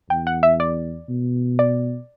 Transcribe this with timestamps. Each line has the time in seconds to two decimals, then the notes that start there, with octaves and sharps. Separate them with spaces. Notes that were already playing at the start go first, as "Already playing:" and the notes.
0.10 E2 G5
0.27 F#5
0.43 E5
0.60 D5
1.09 B2
1.59 D5